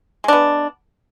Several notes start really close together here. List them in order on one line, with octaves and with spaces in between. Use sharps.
G#3 D4 B3